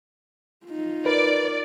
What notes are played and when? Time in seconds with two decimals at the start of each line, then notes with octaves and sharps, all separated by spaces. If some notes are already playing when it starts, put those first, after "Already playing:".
0.66 D#4 F4
1.06 A#4 B4 D5